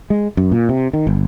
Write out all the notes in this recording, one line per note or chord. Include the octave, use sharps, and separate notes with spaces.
G#3
F#2
A#2
C3
D#3
G1